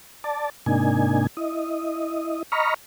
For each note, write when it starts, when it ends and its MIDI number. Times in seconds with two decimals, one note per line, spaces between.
0.24 0.50 74
0.24 0.50 81
0.66 1.27 44
0.66 1.27 48
0.66 1.27 58
0.66 1.27 62
0.66 1.27 63
0.66 1.27 80
1.37 2.43 64
1.37 2.43 75
2.52 2.74 75
2.52 2.74 82
2.52 2.74 83
2.52 2.74 85
2.52 2.74 89